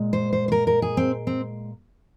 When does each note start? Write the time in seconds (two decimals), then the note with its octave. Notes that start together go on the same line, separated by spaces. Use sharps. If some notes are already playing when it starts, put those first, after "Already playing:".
Already playing: A#2 G#3
0.13 C5
0.33 C5
0.48 C5
0.52 A#4
0.67 A#4
0.82 G#4
0.97 C4
1.27 C4